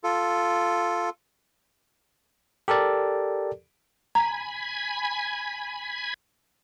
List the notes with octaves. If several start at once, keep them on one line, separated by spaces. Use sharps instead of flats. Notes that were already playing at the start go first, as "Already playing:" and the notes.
F4 A4
G4 A4 A#4 D5
G#5 A#5 B5